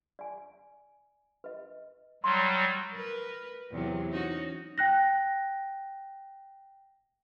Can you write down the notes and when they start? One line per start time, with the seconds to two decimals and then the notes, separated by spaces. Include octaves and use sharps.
0.19 D5 G#5
1.44 B4 D#5
2.24 F#3 G3 C6
2.93 A#4 B4
3.71 E2 C3 F#3
4.10 C#4 D#4 F#4
4.78 G5 F#6 A#6